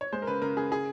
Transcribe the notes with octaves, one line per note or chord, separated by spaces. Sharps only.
C#5
G#3 C5
A#4
C#3 B4
C#3 A#4
C#3 G#4
G#4